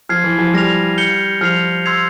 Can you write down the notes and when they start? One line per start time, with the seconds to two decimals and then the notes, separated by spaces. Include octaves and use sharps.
0.09 F3 F6 G#6 C7
0.24 E3
0.39 F3
0.54 G3 F6 A#6 F7
0.98 G6 C#7 G7
1.41 F3 F6 C7 F7
1.86 C6 E6 G#6 C7 F7